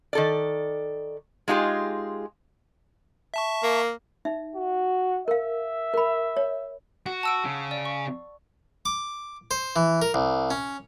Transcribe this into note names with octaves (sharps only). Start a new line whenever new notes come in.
D#3 A4 D5
G#3 D#4 F4 G4 G#4
E5 A5 C#6
A#3
D#4 E5
F#4
A#4 E5 F5
A#4 B5
C#5
F#4 F#5
A5 E6 D7
C#3
D5
C#6
D6
C5
E3
A#4
C2
C#4